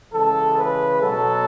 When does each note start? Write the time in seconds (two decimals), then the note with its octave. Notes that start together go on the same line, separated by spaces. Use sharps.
0.12 C#3 E3 G#3 A4
0.57 B4
1.01 B2 F#3 B3 A4